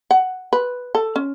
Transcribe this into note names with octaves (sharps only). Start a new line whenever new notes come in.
F#5
B4
A4
C#4